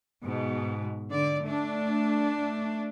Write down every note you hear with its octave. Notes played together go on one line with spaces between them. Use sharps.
G#2 B2
D3 D5
A3 D4